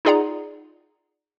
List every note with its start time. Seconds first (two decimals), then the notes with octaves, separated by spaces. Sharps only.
0.05 D#4 F4 G#4 D5 F#5 A#5